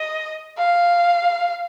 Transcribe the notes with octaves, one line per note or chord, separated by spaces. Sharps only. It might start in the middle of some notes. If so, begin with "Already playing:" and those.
Already playing: D#5
F5